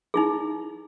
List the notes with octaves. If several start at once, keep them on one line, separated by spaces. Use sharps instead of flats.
D#4 E4 G#4